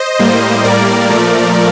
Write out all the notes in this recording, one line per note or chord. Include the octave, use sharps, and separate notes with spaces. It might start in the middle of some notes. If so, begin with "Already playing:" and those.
Already playing: C5 D#5
A2 G3 A#3
A2 G3 A#3 A#4 D5
A#2 F3 A3